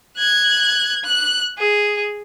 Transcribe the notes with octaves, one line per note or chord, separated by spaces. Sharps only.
F#6 G#6
F#6
G#4